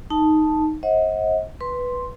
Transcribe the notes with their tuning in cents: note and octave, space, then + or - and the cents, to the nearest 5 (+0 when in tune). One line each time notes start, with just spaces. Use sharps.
D#4 +0 A5 +0
C5 +45 D#5 +40 F#5 -15
B4 +0 C6 +0